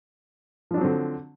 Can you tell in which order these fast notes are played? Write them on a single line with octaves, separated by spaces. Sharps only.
F3 D4 F#3 C4 D3